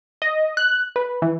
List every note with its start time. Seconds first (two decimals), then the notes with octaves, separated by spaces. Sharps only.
0.22 D#5
0.57 F#6
0.96 B4
1.22 E3